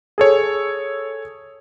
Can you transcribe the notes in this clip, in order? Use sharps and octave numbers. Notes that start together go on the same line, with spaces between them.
G#4 A4 C#5